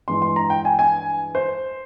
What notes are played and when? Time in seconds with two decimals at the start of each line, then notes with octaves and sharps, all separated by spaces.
0.08 G2 E3 G#3 C6
0.22 C6
0.36 A#5
0.50 G5
0.65 G#5
0.79 G#5
1.35 C5